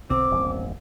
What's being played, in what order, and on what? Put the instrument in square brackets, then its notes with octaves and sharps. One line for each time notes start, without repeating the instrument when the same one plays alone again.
[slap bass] B1 D3 [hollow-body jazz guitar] C4 [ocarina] D6
[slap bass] D#1 A1 G2